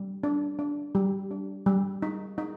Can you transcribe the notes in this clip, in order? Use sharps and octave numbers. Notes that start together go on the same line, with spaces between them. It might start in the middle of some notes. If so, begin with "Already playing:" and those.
Already playing: G3
D4
D4
G3
D4
G3
D#4
D#4